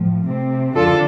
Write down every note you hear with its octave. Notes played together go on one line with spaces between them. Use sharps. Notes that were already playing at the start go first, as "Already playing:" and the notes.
Already playing: A2 F3
C3 A3 C4
F2 D3 F3 D4 F4 A4